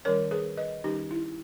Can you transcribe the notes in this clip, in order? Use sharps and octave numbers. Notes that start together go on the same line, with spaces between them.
D#3 G3 C#4 A#4 C#5
G#4 B4
B4 D#5
D#3 G3 C#4 D#4 G4
E4